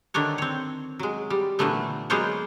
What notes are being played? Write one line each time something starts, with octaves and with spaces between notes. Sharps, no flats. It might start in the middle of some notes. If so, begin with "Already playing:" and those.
D3 D#3 D4 C#5
C4 C#5
F#3 G#3
G3
A#2 D3 E3 F#3 A3 B3
F#3 G#3 A#3 B3 C5 C#5